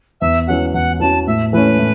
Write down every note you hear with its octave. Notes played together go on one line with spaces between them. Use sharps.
E2 E5
E3 C#4 F#4 F#5
E2 F#5
E3 C#4 F#4 A5
A2 E5
E3 A3 C#4 B4
A2